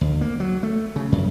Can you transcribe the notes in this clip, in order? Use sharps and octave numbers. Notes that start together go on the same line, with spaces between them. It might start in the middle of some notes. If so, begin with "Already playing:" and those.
D2
A#3
F#3
A3
C#3
F#2